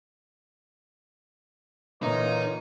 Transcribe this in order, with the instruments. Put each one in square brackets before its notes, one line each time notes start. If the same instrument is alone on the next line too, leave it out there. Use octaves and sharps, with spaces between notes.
[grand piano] A#2 D3 E3 [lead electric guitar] D#4 [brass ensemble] F4 A#4 C#5